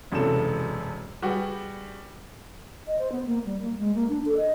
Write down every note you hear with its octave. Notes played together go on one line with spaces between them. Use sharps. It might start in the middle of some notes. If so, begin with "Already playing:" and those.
E1 F#2 C3 E3 A4 E7
G3 F#4 G#4 B4 G5
D#5
C5
B3
A#3
G3
A#3
G#3
A#3
D4
A4
D#5